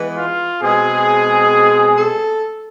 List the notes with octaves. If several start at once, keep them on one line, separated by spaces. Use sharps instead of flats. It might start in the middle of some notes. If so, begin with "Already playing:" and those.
Already playing: E3 G#3 B3
F4
B2 G#3 C4 G#4
A4